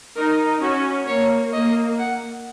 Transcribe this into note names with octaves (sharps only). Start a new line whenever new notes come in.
D#4 A#4
C#4 F#4
A#3 C#5
A#3 D#5
F#5